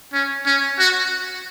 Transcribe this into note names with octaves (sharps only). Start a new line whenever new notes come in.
C#4
C#4
F#4